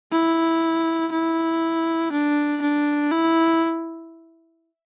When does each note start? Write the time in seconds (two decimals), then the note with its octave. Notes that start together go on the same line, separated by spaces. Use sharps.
0.12 E4
1.12 E4
2.12 D4
2.62 D4
3.11 E4